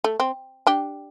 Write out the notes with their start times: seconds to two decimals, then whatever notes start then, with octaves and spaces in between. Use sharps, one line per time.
0.04 A3
0.20 C4
0.67 D4 G4